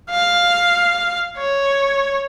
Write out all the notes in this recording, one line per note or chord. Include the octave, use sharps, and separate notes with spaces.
F5
C#5